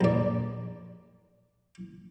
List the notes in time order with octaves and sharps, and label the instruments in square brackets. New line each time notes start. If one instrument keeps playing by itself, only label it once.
[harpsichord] A#1 D5